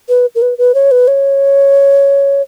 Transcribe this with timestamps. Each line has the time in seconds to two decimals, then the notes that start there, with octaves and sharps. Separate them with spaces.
0.09 B4
0.35 A#4
0.42 B4
0.58 B4
0.75 C#5
0.91 B4
1.08 C#5